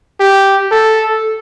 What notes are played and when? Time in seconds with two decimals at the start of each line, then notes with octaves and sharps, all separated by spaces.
0.20 G4
0.72 A4